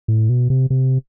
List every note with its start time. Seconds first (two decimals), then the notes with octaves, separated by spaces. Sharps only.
0.08 A2
0.29 B2
0.50 C3
0.70 C3